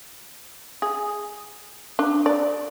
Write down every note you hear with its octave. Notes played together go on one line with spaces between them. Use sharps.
G#4
D4
D5